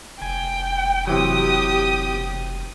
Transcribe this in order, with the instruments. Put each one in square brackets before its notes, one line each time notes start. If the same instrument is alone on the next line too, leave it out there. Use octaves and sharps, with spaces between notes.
[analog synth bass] F1 [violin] G5 [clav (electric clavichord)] G#5
[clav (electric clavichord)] C3 E3 F#3 [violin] G4 D#6